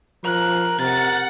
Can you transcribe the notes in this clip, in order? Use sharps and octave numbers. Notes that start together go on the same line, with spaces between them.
F3 A#4 F#6
C3 A#4 F#5 A6